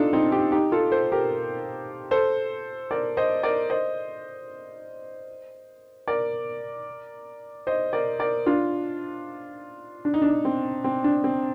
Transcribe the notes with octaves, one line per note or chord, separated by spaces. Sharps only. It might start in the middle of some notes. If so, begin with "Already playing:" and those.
Already playing: D4 D#4 F4 A4
C4 D#4
D#4 G4
D#4 G4
F4 A4
A4 C5
G4 A#4
A4 C5
A#4 D5
C5 D#5
A#4 D5
C5 D#5
A#4 D5
C5 D#5
A#4 D5
A#4 D5
D4 F4
D4
D#4
D4
C4
C4
D4
C4